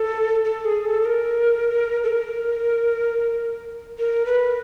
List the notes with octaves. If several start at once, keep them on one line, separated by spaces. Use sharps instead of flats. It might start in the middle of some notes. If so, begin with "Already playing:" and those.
Already playing: A4
A4
G#4
A4
A4
A#4
A4
A#4
A#4
B4